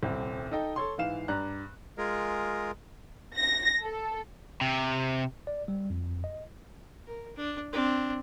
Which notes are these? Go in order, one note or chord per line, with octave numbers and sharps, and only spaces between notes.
D#1 C2 C4
D#4 A4 D#5 G5
A4 C#5 C6
G#2 E3 F5 E7
G2 D5 A#5 F#6
G#3 F4 G#4 A#4
A#6
A4
C3
D5
G3
F2
D#5
A#4
D4
C4 D4